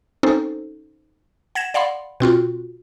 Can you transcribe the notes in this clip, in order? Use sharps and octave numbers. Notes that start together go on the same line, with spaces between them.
C4 C#4 D#4 A4 C5
F#5 G#6 A#6 E7
D5 F5 F#5 B5 C6
B2 C4 F4 F#4